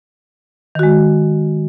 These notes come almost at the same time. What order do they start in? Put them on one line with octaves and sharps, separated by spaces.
D#3 F#4 G#3